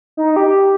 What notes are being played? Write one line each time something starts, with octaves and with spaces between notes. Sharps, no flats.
D#4
G4